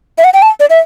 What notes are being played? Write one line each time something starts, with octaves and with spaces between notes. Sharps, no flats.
E5
F#5
G5
A5
D5
E5